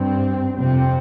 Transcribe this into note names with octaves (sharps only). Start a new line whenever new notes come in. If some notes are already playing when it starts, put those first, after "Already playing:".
Already playing: G2 C4
F2 C3 C4